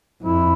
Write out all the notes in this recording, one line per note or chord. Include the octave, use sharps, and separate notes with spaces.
F2 E4